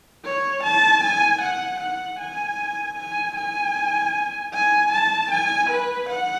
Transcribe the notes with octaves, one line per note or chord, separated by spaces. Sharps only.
C#5
A5
G#5
F#5
F#5
G#5
G#5
G#5
G#5
A5
G#5
B4
F#5